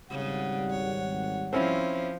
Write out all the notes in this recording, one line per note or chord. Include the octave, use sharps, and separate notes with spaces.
G#1 C#3 G3 F#5
C#5
F3 C4 C#4 E4